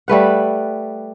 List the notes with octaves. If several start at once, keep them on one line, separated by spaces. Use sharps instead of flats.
G3 A3 B4 F#5